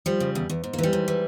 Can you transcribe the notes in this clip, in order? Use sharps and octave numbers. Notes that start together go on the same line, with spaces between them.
F3 G3
C#3
E2
E2
G#2
A#3
E3 G3
G#2
E3